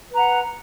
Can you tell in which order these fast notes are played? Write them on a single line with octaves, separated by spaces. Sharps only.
B4 A#5 F#5